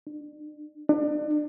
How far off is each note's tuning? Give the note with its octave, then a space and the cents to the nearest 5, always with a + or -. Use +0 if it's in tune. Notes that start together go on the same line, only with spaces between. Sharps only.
D4 +35
D4 +35